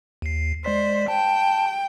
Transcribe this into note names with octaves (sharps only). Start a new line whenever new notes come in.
D#2 C7
G#3 C5 D5 B6
G5 A5